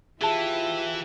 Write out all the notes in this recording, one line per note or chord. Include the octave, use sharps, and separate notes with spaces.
E3 F4 G4 G#4 E5 A5